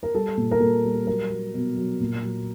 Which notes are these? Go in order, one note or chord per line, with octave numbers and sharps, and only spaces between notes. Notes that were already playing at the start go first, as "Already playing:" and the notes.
A#4
G3 A4
A#2
A#4
A#2 A4
G3
F#3 A#4
F#3
B2
F#3
A#2
F#3